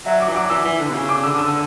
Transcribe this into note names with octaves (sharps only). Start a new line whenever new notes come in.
F#3 E5
D6
E3
F#3 D6
E3 E6
E3
D3
B2
C#3
D6
D3 E6
D3
E6
D3